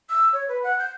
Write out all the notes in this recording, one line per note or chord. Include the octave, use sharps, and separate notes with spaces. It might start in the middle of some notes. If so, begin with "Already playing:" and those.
E6
C#5
B4
F#5
G6